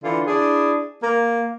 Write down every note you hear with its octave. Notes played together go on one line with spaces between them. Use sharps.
D3 E3 F4
D4 E4 G#4
A#3